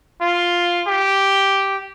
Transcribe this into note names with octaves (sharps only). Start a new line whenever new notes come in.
F4
G4